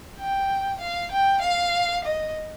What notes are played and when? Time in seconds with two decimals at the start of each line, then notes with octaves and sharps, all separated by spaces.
0.18 G5
0.80 F5
1.11 G5
1.42 F5
2.05 D#5